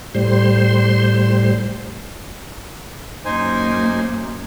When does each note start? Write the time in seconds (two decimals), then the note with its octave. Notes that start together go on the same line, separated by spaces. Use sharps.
0.15 A2 G3 C5 C6
3.25 F#2 A#3 D#4 C5 G#5